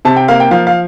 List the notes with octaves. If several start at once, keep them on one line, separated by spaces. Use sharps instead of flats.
C3 A5
G5
A#3 F5
G5
F3 F5
F5